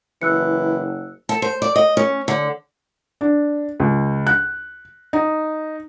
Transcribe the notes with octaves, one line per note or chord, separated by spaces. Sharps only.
F#1 E3 E6 F#6 C#7
A4
C5
D5
D#5
C#4
D3
D4
C#2
F#6
D#4